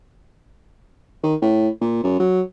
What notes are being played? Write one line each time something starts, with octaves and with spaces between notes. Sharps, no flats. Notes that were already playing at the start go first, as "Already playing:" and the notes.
D#3
A2
A#2
F#2
F#3